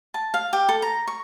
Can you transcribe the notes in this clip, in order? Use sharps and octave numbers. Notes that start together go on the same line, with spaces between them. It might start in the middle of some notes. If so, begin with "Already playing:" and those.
A5
F5
G4
A4
A#5
C#6